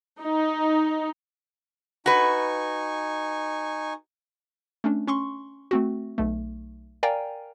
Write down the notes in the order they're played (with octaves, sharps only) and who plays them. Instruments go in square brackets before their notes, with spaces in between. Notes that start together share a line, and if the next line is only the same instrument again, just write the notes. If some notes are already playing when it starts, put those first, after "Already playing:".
[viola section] D#4
[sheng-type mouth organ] D#4 G#5 C#6 [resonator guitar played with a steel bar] F#4 B4
[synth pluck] A3 C#4 D4
C#4 C6 C#6
A3 C4 F#4
B1 A3
A#4 D5 F5 G5 G#5 A#5